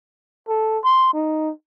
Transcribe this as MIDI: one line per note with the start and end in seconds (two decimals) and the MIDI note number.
0.48 0.79 69
0.84 1.10 84
1.14 1.51 63